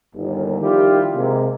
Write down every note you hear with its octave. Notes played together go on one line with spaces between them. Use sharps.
G1 D#2
D#3 F3 G3 E4 F4 G4
C3 G#3 A#3